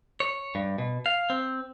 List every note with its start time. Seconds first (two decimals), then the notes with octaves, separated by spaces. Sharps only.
0.20 C#5
0.55 G2
0.78 B2
1.06 F5
1.30 C4